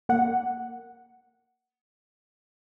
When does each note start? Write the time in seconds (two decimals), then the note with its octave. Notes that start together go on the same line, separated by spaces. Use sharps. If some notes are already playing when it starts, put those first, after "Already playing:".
0.09 A#3 F#5